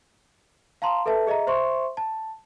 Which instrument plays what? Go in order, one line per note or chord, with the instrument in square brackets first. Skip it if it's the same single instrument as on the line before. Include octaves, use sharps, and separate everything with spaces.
[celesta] F5 A5 A#5 C6
A4 B4 E5 A5
G#4 D#5 E5 A#5
C5 E5 C6 C#6
A5